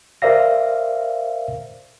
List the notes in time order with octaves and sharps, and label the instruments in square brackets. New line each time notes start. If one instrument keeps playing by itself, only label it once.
[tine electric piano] A#4 C5 D5 E5 F5 A#6